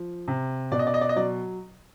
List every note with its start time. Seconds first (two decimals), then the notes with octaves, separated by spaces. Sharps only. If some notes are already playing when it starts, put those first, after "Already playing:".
Already playing: F3
0.28 C3
0.72 B2 D5
0.79 D#5
0.87 D5
0.94 D#5
1.01 D5
1.09 D#5
1.16 F#3 D5